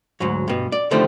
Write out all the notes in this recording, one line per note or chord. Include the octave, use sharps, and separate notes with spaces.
D2 G#2 F#3
G2 B2
D5
D3 D#3 F3 G3 A3 C4